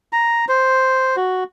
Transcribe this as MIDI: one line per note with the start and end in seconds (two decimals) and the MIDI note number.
0.13 0.45 82
0.49 1.16 72
1.16 1.44 66